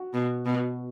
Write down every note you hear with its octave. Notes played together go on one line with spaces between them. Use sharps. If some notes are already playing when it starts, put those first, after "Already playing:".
Already playing: F#4
B2
B2